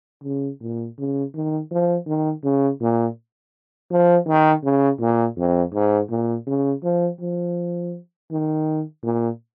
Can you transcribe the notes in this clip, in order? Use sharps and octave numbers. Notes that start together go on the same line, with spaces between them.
C#3
A#2
C#3
D#3
F3
D#3
C#3
A#2
F3
D#3
C#3
A#2
F2
G#2
A#2
C#3
F3
F3
D#3
A#2